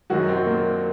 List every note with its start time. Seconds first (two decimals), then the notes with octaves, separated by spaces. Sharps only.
0.10 F#2 D#3 F#3 F#4
0.28 C3 C4
0.46 A#2 A#3